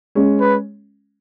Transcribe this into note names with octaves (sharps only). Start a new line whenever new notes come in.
G#3 C#4
B4